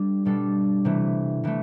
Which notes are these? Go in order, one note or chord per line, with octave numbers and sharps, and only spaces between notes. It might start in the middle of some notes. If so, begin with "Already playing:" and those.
Already playing: G3 D4 A4
B2 G3 D4 A4
C3 E3 A3
C3 E3 A3